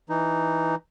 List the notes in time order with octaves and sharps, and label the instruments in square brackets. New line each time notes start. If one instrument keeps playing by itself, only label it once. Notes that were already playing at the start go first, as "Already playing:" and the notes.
[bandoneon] E3 D#4